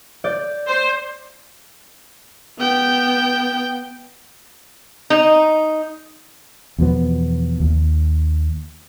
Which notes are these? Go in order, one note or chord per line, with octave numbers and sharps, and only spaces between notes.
D5 G6
C5
B3 G5
D#4
E2 B2 F3 B3
D#2